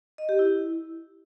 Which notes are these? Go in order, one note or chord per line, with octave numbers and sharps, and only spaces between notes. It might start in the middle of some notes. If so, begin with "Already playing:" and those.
D#5
G4
E4